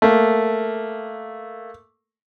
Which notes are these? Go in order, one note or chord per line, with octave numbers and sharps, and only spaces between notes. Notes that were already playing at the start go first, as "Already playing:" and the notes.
A3 A#3